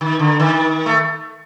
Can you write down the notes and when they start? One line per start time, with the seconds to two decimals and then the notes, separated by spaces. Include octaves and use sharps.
0.01 D#3
0.19 D3
0.40 D#3
0.86 A3